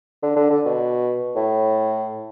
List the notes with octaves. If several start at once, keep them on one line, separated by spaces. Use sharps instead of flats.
D3
D3
D3
B2
A2